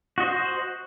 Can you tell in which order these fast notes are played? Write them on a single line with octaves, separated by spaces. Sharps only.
F#4 D#5 C5